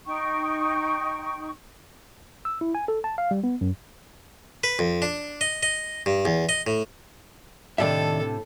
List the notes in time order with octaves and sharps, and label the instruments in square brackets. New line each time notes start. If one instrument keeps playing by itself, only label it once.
[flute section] D#4 G5 C#6
[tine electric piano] E6
E4
G#5
A4
A5
F5
G3
B3
F#2
[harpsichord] B4
F2
D4
D#5
D#5
G2
E2
D#5
A2
[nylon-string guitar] A2 C3 D4 [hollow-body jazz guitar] D#3 D5 E5 [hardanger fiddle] A4